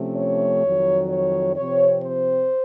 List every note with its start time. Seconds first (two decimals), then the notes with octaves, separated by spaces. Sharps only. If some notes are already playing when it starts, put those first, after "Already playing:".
Already playing: C3 F3 A3 C#4
0.16 C#5
0.62 F2 D#3 F#3
1.10 C#5
1.56 C3 F3 C4 C#5
2.03 C5